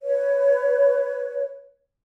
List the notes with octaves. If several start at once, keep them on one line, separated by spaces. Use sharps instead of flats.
B4 C#5